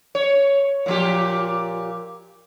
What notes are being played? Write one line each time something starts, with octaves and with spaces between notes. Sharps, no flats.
C#5
A#2 F3 G4